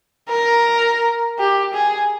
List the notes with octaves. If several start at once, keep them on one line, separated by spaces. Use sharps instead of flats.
A#4
G4
G#4